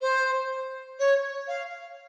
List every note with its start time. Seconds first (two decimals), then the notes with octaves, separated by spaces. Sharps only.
0.01 C5
0.99 C#5
1.48 F5